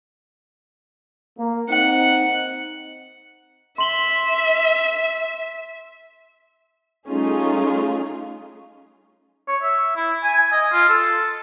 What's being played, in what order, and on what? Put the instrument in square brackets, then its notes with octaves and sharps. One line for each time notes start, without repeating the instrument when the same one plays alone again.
[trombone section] A#3
[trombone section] C4 D#4 [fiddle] F#5
[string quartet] E5 [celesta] C6 F#7 G7
[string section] G3 A3 C#4 D#4 F4 G#4
[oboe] C#5
E5
E4
G#5
G#5
D#5
F4
A4